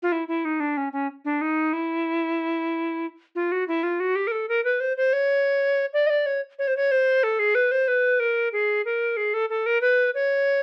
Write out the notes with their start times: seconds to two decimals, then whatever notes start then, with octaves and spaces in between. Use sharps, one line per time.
0.03 F4
0.12 E4
0.28 E4
0.45 D#4
0.60 D4
0.77 C#4
0.93 C#4
1.25 D4
1.41 D#4
1.73 E4
3.35 F4
3.52 F#4
3.68 E4
3.83 F4
4.00 F#4
4.16 G4
4.27 A#4
4.32 A4
4.49 A#4
4.64 B4
4.80 C5
4.97 C5
5.13 C#5
5.93 D5
6.07 D#5
6.10 D5
6.26 C#5
6.59 C#5
6.68 C5
6.77 C#5
6.91 C5
7.23 A4
7.39 G#4
7.55 B4
7.71 C5
7.88 B4
8.20 A#4
8.53 G#4
8.85 A#4
9.17 G#4
9.34 A4
9.50 A4
9.66 A#4
9.81 B4
10.15 C#5